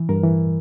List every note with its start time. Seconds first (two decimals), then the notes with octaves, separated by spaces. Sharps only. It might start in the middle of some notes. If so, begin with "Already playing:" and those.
Already playing: E3
0.09 G2 A#4
0.23 E3